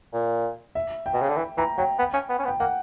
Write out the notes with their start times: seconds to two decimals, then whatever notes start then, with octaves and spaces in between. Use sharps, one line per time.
0.13 A#2
0.75 E5
1.06 G5
1.13 B2
1.22 C#3
1.29 D3
1.36 E3
1.57 E3 A#5
1.78 F#3 G5
1.99 B3
2.13 C#4
2.29 B3
2.39 C#4
2.45 B3
2.48 G5
2.60 A#3 F#5